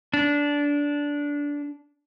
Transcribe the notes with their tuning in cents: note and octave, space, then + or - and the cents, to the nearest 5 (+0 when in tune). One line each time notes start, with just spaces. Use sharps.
D4 -15